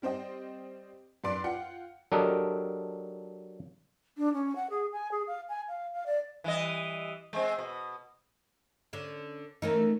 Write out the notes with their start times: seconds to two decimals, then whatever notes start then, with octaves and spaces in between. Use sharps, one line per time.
0.02 G3 C4 C5 D#5 G5
1.24 F#2 B4 D5 C6 D7
1.44 F4 F#5 G5 C#7
2.12 F#3 D4 G4 A4 A#4 D#5
4.18 D4
4.33 C#4
4.55 F#5
4.70 G#4
4.92 G#5
5.11 G#4
5.27 F5
5.49 G#5
5.68 F5
5.94 F5
6.06 D5
6.44 E3 G3 D#5
7.33 G#3 C4
7.59 B2
8.93 D3 C#4
9.62 E3 A3 C#4 D#4 A#4